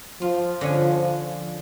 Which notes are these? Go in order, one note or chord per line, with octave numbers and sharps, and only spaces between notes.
F3 F4
D3 C#4 G#5